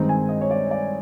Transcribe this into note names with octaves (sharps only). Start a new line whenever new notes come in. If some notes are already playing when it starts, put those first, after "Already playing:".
Already playing: G2 D#3 G#3 C4 D#4
G#5
D#5
C#5
D5
D5